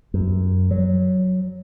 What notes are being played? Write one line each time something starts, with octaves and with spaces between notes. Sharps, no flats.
F#2
F#3